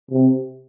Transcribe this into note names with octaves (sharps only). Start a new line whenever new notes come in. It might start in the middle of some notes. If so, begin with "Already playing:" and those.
C3